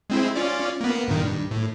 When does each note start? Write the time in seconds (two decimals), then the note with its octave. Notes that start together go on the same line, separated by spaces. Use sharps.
0.10 G#3 C4 E4
0.36 C#4 F4 D5
0.81 A#3 B3
1.08 G2 A#2 D#3
1.22 G2
1.51 A2